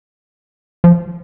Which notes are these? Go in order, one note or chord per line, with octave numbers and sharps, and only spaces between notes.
F3